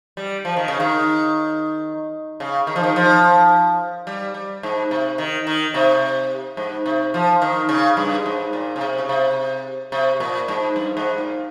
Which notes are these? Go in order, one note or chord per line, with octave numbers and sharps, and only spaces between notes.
G3
F3
D#3
C#3
D#3
C#3
D#3
F3
D#3
F3
G3
G3
G#2
C3
D#3
D#3
C3
G#2
C3
F3
D#3
C#3
G2
G#2
A#2
C#3
C3
C#3
C3
C3
A#2
G#2
G2
G#2
A#2